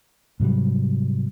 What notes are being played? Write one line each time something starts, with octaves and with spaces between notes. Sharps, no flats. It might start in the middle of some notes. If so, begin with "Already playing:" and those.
G#2 C3 F#3 G3